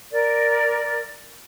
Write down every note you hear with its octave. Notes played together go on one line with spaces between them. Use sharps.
A#4 D5